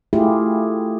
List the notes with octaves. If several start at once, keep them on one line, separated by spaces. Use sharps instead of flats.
A3 E4 F4 G4 G#4